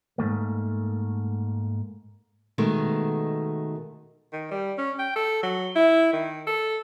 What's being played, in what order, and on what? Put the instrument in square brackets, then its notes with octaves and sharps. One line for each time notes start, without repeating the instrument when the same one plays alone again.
[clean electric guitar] G#2 F3 A3 A#3
[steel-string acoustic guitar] B2 D#3 G#3 A3
[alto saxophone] D#3
G3
C#4
G5
A4
F#3
E4
D#3
A4